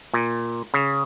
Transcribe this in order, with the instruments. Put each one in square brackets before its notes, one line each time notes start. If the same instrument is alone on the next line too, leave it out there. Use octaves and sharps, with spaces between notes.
[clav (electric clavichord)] A#2
C#3